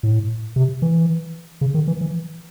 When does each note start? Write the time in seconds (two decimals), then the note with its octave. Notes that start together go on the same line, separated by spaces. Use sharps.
0.03 A2
0.56 C3
0.82 E3
1.61 C#3
1.74 D#3
1.88 E3
2.01 E3